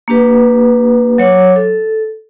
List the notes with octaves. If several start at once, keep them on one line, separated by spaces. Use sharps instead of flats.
A#3 D4 G4 B4
F#3 C#5 F#5 D6
A4